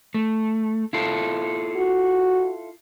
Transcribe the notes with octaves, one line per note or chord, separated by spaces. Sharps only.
A3
E4 F4 A4
F#4